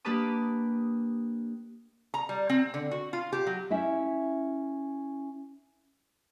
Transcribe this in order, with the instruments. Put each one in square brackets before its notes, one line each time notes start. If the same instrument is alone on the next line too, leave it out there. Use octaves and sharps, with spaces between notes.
[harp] A#3 D4 G4 B4 A5 D#6
[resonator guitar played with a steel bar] A#5
G3
C4
D3
F#4
F4
G4
F#3
[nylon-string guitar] C#4 E4 E5